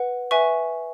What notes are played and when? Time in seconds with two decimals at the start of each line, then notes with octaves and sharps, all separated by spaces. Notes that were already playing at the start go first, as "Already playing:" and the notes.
Already playing: B4 F#5
0.31 B4 E5 G#5 C#6